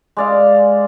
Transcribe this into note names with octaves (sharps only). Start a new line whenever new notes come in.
G#3 D5 F5